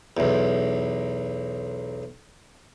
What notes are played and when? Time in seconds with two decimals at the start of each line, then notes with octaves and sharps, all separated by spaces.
0.17 B1 E2